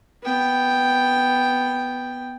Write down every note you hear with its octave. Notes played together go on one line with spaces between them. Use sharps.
B3 G5